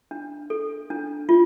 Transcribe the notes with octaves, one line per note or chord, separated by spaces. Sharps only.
D4
A4
D4
F4